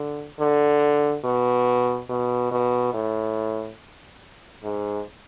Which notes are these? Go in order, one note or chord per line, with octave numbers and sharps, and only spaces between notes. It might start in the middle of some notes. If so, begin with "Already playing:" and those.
Already playing: D3
D3
B2
B2
B2
A2
G#2